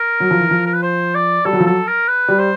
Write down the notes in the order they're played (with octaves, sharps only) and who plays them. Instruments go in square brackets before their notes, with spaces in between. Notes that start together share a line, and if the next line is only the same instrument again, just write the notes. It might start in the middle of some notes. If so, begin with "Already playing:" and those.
Already playing: [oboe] A#4
[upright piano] F#3
F3
E3
F3
[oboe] A#4
B4
C5
D5
[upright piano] G3 [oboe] A4
[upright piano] F#3
F3
[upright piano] F#3 [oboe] A4
[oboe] A#4
B4
[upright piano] G3
[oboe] C5